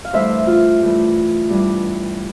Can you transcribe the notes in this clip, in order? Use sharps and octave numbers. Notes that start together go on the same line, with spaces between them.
F5
G2 E3 A3 C5 E5
F4
G2 E3 A3
G2 E3 G3